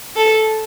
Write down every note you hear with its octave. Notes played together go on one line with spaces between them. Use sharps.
A4